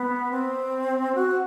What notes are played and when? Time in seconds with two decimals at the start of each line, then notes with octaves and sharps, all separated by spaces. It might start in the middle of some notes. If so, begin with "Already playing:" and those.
Already playing: B3
0.31 C4
1.15 F#4